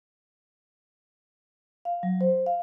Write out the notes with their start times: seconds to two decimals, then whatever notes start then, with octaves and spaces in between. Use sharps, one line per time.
1.85 F5
2.03 F#3
2.21 C5
2.46 F5